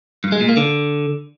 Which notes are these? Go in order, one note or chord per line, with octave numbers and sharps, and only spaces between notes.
G2
G#3
A#2
A#3
D3